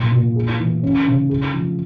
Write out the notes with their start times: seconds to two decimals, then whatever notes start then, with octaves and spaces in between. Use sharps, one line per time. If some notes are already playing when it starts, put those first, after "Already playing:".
Already playing: A#2
0.12 A#2
0.36 G#4
0.60 E3
0.83 C#4
1.07 C#3
1.30 G#4
1.53 F3